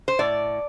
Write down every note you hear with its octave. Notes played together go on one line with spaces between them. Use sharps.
C5
A2 D5